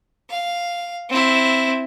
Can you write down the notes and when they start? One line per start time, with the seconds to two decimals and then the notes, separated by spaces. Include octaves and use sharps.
0.30 F5
1.10 C4 E4